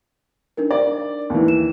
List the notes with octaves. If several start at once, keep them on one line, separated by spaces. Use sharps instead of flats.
D4 D#4 A#4
D5
D#2 E3
E7